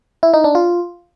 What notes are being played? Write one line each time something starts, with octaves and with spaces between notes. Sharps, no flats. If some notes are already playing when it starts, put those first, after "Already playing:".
E4
D#4
D4
F4